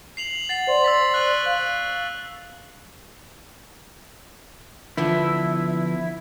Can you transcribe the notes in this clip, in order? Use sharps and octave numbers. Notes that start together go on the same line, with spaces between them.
C7 F7 F#7
F#5 A6 C7 F#7
C5 D5 C6
E6 A6 B6
C#6 F#6
F5 F#6
D3 F3 B3 E4